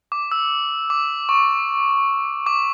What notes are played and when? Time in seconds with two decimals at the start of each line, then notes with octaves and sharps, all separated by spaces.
0.12 D6
0.32 E6
0.90 D6
1.29 C#6
2.46 D6